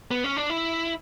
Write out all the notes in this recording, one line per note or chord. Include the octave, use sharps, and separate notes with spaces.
B3
C#4
D4
E4